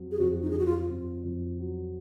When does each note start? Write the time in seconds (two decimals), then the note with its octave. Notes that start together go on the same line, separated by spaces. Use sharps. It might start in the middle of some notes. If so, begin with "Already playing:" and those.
Already playing: F2 F#3
0.12 G#4
0.19 F2 F#4
0.42 D#4
0.50 G#4
0.54 F2 F#4
0.66 F4
0.90 F2
1.24 F2
1.59 F#3